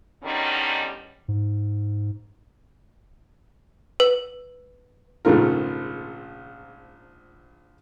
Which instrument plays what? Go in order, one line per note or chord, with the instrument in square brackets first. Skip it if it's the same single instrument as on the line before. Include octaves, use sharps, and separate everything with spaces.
[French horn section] E2 D3 D#3 G3 C#4 D#4
[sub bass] G#2
[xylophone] B4
[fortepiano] A#1 G#2 C#3 A3 F4 A#4